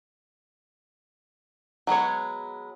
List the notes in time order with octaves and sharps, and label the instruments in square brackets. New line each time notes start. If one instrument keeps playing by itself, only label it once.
[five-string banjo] F#3 G#3 B3 C#5